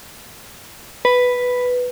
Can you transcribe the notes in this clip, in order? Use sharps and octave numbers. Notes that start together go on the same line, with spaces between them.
B4